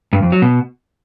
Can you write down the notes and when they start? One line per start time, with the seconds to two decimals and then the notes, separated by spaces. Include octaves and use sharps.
0.13 G2
0.22 F2
0.32 F#3
0.42 B2